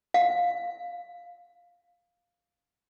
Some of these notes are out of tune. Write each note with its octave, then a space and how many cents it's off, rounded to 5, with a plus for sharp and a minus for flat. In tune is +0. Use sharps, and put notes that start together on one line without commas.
F5 +5